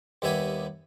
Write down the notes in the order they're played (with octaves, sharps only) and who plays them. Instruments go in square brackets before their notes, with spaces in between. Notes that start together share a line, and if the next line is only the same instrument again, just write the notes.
[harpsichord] D#2 G3 B3 E5 G#5